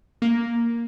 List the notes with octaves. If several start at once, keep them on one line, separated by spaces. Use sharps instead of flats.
A#3